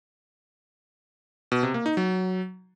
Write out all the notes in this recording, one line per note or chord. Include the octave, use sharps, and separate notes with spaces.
B2
C3
A#3
D#4
F#3